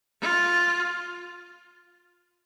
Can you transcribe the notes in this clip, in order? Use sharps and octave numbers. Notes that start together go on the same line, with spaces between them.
F4